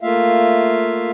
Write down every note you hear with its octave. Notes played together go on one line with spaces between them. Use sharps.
A3 A#3 F4 E5 F5